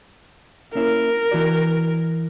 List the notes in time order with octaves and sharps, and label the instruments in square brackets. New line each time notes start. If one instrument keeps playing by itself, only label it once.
[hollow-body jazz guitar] A#3 C#4 E4 [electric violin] A#4
[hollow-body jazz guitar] E3 F#4 D5